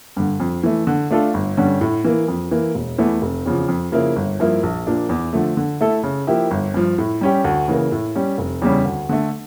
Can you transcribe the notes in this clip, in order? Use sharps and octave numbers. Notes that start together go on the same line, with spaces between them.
G2 D3
F2
E3 A3
D3
A3 D4 F4 A4
G1
G2 D3 G3 C#4
A2
E3 A#3
F2
E3 A#3
E1
E2 E3 A3
F1
E2 C#3 F3
F2
C#3 F3 A#3 E4
G1
G2 F3 A#3 E4
A#1
A#2 F3 A#3 D4
E2
D3 F3 A3
D3
A3 E4 A4
C#3
F3 A#3 E4 G4
G1
G2 F3
A2
G3 C#4 G4
D2
C#3 E3 A#3
A2
G3 C#4 G4
F1
E2 C#3 G3 C#4
D2
D3 A3